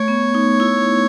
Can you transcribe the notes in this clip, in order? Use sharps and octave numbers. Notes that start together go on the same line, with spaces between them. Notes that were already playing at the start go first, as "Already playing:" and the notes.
Already playing: A3 C#5
B3
D#4
E4